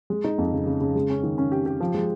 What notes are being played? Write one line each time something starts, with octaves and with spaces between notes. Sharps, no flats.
G#3
D#4
F2
C#3
C#3
C#3
G#3
C#4
D#3
C#4
G4
G4
F3
G#3